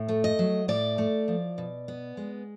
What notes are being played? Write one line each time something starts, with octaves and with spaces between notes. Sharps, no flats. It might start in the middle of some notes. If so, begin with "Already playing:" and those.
Already playing: A2
A3
D#5
F#3
A2 D5
A3
F3
B2
B3
G#3